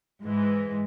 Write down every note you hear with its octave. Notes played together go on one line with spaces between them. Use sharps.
G#2 E3 G#3